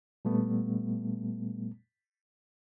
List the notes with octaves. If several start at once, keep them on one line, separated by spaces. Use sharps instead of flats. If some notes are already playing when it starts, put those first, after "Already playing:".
A#2 G3 A3 B3